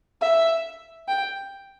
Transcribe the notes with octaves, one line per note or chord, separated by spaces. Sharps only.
E5
G5